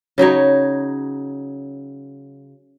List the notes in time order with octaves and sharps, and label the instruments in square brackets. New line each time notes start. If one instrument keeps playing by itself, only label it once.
[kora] C#3 F#3 D#4 C#5